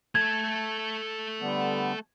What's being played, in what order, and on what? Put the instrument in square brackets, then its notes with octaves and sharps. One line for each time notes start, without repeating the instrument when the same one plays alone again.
[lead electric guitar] A3 A4 [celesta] G#6
[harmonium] D3 G3 B3